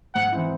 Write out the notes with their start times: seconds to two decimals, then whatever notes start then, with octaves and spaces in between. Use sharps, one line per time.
0.15 G#2 F#5
0.32 E3 C4 E4